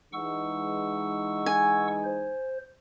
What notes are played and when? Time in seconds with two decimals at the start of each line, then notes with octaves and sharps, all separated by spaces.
0.13 E3 G#3 D#4 F#5 C#6 E6
1.46 G#5
2.05 C5